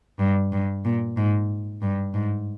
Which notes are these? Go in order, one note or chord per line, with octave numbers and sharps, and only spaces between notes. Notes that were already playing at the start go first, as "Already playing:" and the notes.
G2
G2
A#2
G#2
G2
G#2